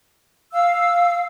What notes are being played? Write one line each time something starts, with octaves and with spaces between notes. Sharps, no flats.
F5 E6